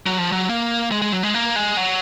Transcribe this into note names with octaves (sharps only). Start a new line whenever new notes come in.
F#3
F3
F#3
A#3
G#3
G#3
F#3
G#3
A#3
G#3
F#3